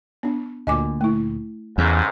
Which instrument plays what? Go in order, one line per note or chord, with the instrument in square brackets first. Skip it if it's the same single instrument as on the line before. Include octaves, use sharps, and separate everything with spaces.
[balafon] B3 D4
[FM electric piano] D2 A#2 [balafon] D#5 G#5 D6
[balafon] A3 E4
[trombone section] A1 G#2 [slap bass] E2 [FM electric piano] C#3